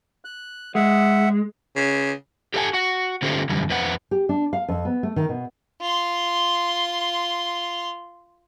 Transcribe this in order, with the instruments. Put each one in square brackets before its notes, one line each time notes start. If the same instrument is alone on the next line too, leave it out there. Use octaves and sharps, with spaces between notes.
[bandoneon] F#6
[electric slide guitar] G#3 [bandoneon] E5 F#5
[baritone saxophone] C#3
[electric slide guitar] G4 A4 B4 F5 F#5 G#5
F#4 F#5
D3 C#4 F4 G4 A4 C5
F#2 D3 E3 G3
F2 B4 C5 F#5
[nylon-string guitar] G4
D4
F5
F2
B3
A3
D#3
B2
[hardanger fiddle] F4 C6